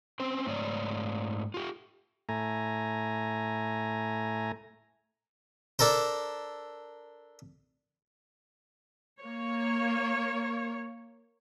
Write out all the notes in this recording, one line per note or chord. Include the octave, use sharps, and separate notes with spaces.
C4 C#4 C5
G#2 A3 C#5 D5
F4 G4
A2 A3 G#5 A#5
D4 A4 A#4 C5
A#3 C#5